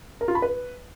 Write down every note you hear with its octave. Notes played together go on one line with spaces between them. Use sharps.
A#4
F4
B5
B4